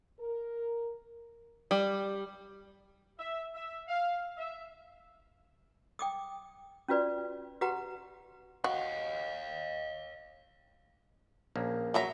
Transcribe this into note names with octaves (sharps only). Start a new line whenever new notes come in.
A#4
G3
E5
E5
F5
E5
G5 D6 D#6
C#4 F4 F#4 B4 D5
F#4 G4 B4 F#5 A#5
F#4 D#5 F5
A#1 A#3 C#4
F#3 E5 A#5